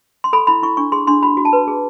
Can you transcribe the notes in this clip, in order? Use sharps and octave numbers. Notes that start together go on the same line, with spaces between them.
C6
A4 B5
E4 B5
E4 C#6
D4 C#6
G#4 C6
D4 C6
F#4 B5
F#4
A5
B4
G#4